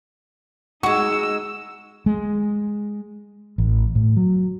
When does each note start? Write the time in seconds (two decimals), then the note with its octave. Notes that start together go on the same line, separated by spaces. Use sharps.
0.83 G#3 D#4 F#4 C#6 E6
2.06 G#3
3.58 A1
3.95 A2
4.17 F#3